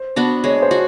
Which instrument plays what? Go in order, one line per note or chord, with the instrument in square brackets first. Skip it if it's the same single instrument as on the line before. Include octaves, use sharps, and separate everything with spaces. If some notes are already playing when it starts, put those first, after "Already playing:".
Already playing: [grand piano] C5
[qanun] B3 D4 F#4
[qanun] G#3 [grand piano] C#5
[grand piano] C5
[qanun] F#4